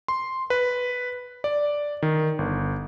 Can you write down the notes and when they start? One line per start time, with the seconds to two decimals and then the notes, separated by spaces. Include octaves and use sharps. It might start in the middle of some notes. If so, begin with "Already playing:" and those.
0.08 C6
0.50 B4
1.44 D5
2.02 D#3
2.39 G1